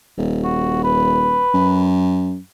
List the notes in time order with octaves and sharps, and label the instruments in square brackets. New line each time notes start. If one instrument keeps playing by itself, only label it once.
[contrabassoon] D#1
[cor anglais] F#4
B4
[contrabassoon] F#2